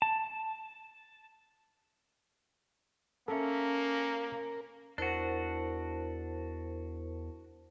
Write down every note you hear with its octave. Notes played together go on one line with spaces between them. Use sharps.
A5
A#3 C#4 A4 A#4 E5
E2 D4 E4 F#4 A#4 C5